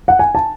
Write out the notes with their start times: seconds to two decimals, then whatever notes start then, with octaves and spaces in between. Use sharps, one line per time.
0.08 F#5
0.19 G#5
0.35 A5